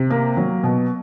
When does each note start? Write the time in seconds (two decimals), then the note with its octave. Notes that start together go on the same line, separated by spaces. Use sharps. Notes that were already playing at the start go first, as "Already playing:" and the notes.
Already playing: C3
0.10 A#3
0.37 F#3
0.63 B2